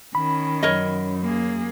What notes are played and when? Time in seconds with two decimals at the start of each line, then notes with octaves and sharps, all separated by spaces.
0.15 D#3 C#4 B5
0.63 F#2 A#4 C#5 D#5
1.23 A#3 G#4